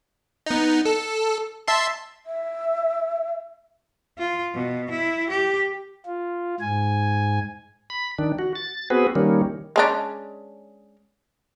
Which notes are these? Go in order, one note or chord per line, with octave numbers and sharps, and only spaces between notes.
B3 D#4
A4
E5 A5 C6
E5
F4
B2
E4
G4
F4
G#2 G#5
B5
D#3 D4
F#4
A6
B3 C4 F#4 G#4 B4
D#3 G3 A#3 C#4
G#3 C#4 D4